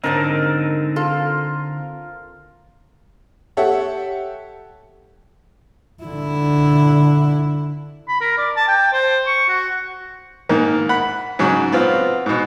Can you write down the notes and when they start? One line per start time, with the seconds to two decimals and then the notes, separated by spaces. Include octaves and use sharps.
0.04 G#2 D3 D#3 C4 C#4 D#4 A#4 A5
0.96 F4 A4
3.57 G4 A4 C#5 E5 F#5
6.03 D3 E4
8.08 B5
8.21 A#4
8.38 D5
8.56 A5
8.68 G5
8.93 C5
9.27 C#6
9.49 F#4
10.49 G#2 D#3 A#3
10.89 F#5 B5
11.39 G#2 C#3 F#3
11.72 B3 C4 F4
12.26 G#2 B2